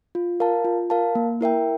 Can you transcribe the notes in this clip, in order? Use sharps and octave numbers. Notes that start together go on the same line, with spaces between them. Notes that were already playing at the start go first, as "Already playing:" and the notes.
F4
A#4 F5 A5
F4
A#4 F5 A5
A#3
E4 A#4 E5 G5